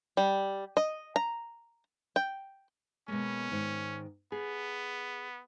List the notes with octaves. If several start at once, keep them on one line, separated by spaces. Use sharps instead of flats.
G3
D#5
A#5
G5
B2 G#3 A#3 C#4
G#2 D#3
B3 G#4